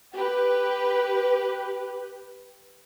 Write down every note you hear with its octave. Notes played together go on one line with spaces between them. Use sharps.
G4 B4